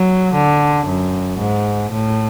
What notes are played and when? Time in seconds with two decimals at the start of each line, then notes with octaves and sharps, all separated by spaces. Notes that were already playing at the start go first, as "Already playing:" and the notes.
Already playing: F#3
0.34 D3
0.86 F#2
1.39 G#2
1.93 A2